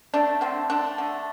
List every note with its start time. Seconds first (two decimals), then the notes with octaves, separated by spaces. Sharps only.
0.14 A3 D4
0.41 D3 C4
0.70 A3 D4
0.98 D3